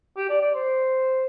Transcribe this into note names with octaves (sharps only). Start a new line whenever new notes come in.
G4
D5
D5
C5